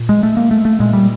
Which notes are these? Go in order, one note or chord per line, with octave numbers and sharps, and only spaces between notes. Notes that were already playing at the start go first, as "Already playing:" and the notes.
Already playing: A#2
G#3
A3
A#3
A3
A3
A#2 G#3
G3